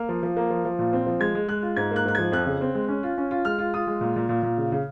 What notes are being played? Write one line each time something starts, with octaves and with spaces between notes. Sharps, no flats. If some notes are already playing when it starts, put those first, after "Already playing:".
Already playing: A#3 F6
F3
F3
A#3
F3
F3
A#2
C4
F3
G#3 G#6
G#3
G#3 F#6
F4
G#2 G#6
A#3 F#6
G#2 F#6
F3 G#6
F2 F#6
C#3
C4
G#3
C#4
F4
C#4
F4
G#3 F6
F4
F4 D#6
G#3
A#2
A#2
A#2
A#2
C#3
C#3